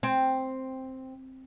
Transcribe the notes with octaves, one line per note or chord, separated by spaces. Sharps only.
C4